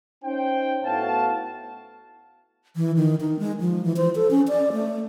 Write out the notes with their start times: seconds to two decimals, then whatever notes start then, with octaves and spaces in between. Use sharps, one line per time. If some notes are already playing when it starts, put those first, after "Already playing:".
0.24 C#4 D#4 C5 G5
0.84 A2 B3 F#4 F5 A5
2.76 E3
2.97 D#3
3.21 D#4
3.39 G#3
3.60 F3
3.84 E3
3.97 C5
4.15 A4
4.31 C#4
4.48 D5
4.72 A3